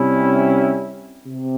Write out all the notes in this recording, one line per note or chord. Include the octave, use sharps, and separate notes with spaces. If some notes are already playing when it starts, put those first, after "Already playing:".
Already playing: C3 G3 C#4 E4
C3